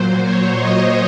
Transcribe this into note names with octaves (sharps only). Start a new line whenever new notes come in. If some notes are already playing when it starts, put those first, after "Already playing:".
Already playing: A#2 F#3 C5
C#5
D#5